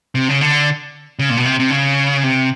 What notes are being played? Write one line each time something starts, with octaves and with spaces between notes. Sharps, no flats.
C3
C#3
D3
C#3
A#2
B2
C3
C3
C#3
C3